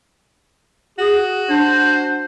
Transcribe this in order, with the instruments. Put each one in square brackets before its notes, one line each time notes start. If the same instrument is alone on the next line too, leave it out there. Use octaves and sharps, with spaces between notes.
[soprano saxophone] F#4 [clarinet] G#4
[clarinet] D4 [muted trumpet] C5